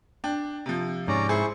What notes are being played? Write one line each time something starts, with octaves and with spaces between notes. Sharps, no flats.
D4 G5
C3 F3
G#2 C#4 D5 A#5
E4 G#4 C5 C#6